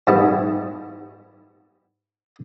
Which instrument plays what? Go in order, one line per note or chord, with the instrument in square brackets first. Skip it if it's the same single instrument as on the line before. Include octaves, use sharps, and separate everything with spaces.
[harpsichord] G#2 G3 B3 E4